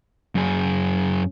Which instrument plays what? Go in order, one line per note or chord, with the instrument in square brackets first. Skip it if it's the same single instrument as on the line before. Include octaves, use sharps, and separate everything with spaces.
[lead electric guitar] F#2 G#4